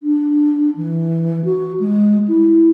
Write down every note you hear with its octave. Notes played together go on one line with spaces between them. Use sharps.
D4
E3
F#4
G#3
E4